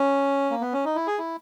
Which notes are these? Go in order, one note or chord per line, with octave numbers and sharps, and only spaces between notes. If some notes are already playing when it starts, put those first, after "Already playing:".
Already playing: C#4
A#3
B3
C#4
D#4
E4
G#4
E4